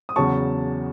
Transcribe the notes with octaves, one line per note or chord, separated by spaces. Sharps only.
D#6
E2 C#3 F#3 A5 C#6